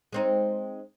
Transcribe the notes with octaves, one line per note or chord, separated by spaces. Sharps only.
G#3 C4 D#4